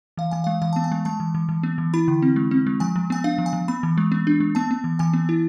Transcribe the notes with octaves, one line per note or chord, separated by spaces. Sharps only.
E3 F5
E3 G#5
G#3 F5
E3 F5
B3 A5
G#5
G#3
G#3 A5
E3
E3
E3
B3
E3
E4 B5
D3
C4
G#3
C4
G#3
F3 G#5
F3
B3 G#5
D4 F5
F3
G#5
F3
B3 B5
E3
G#3
B3
D4
G#3
B3 A5
B3
E3
E3 G#5
B3
E4